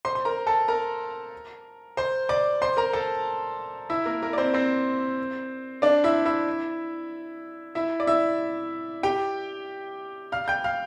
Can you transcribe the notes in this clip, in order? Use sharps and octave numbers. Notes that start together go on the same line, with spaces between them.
C5 C6
C6
A#4 A#5
A4 A5
A#4 A#5
C5 C6
D5 D6
C5 C6
A#4 A#5
A4 A5
E4 E5
A#3 A#4
A#3 A#4
D5
C4 C5
C4 C5
D4 D5
E4 E5
E4 E5
E4 E5
D5
E4 E5
G4 G5
F5 F6
G5 G6
F5 F6